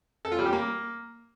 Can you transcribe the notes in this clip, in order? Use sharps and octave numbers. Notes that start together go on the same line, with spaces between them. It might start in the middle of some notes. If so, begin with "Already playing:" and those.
A4
F4
G3
G4
A#3